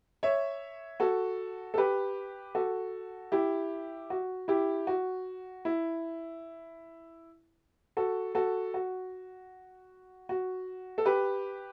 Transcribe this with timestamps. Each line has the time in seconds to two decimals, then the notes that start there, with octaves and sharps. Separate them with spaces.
0.23 C#5 E5
1.00 F#4 A4
1.74 A4
1.78 G4 B4
2.55 F#4 A4
3.32 E4 G4
4.10 F#4
4.48 E4 G4
4.87 F#4
5.65 E4
7.97 F#4 A4
8.35 F#4 A4
8.74 F#4
10.29 F#4
10.98 A4
11.05 G4 B4